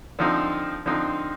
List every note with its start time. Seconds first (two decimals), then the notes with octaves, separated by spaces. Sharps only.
0.19 D3 F3 C4 D#4
0.86 D3 F3 C4 D#4